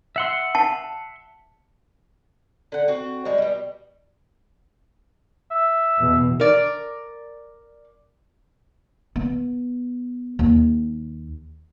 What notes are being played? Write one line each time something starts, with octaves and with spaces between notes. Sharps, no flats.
E5 F#5 C6
A5
D3 F#5
C4 F#4
G3 G#3
B2 G3
E5
E2 B2
A#4 D5
B3
D#2